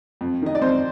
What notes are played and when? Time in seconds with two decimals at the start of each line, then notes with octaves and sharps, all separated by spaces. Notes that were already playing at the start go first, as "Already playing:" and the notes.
0.21 F2
0.42 D#3 D#5
0.55 D5
0.62 F2 C4 C5